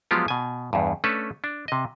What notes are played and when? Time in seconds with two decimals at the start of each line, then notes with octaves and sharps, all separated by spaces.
0.11 F3 F#3 G#3 B3 F4 G4
0.28 B2 G#5
0.73 E2 G2
1.04 A3 C#4 D4 A4 B4
1.44 D4
1.68 C3 D#5